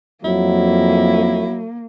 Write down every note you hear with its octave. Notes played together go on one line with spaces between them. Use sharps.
F2 F#3 A#3 E4